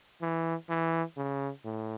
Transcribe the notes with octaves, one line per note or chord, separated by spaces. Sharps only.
E3
E3
C#3
A2